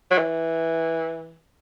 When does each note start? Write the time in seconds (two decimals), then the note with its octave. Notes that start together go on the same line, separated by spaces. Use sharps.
0.11 F#3
0.18 E3